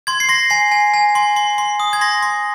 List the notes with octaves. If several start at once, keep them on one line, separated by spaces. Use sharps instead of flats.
C6 G#6
C7
C6 A#6
G#5 C7
G#5
G#5
C6
C6
C6
D#6
G#6
C6 A#6
C6